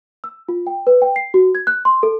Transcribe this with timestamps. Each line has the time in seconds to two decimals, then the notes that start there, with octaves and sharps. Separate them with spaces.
0.24 E6
0.49 F4
0.67 G5
0.87 B4
1.02 G5
1.16 C7
1.34 F#4
1.55 G#6
1.67 F#6
1.85 C6
2.03 A4